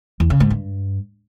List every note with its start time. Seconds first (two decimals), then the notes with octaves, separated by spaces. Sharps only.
0.20 E2
0.30 C#3
0.40 G#2
0.50 G2